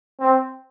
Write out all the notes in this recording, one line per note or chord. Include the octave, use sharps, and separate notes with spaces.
C4